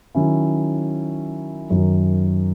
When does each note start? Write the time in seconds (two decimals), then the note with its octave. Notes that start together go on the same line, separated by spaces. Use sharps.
0.15 D#3 F#3 C#4 E4
1.70 F#2 D#3 F#3